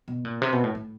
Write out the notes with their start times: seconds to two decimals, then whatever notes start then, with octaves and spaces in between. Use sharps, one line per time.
0.08 B2
0.25 A#2
0.42 C3
0.53 B2
0.64 A2
0.75 A2